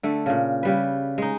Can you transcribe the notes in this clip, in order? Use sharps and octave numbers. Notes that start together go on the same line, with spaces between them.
D3 A3
A#2 C#3
C#3 G3 B4
G#3 D#4